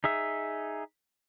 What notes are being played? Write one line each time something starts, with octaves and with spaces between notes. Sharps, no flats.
D#4 G#4 E5